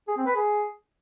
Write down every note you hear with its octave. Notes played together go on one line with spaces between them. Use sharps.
G#4
C4
B4
G#4